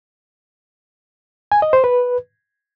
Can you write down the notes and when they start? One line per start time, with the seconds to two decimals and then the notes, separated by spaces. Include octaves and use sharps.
1.52 G#5
1.62 D#5
1.73 C5
1.84 B4